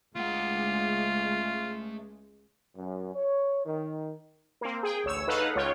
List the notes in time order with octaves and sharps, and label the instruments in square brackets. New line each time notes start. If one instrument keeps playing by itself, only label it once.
[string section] C#2 G#3 [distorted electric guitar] A3 F#5 [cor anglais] F4
[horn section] F#2
C#5
D#3
[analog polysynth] A#3 C4
G#4 G5
A1 D2 C#5 E6
D#4 G#4 A4 B4 F5 F#5
C#2 F4 C#5 G5